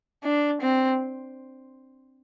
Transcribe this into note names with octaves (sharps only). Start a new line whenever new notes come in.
D4
C4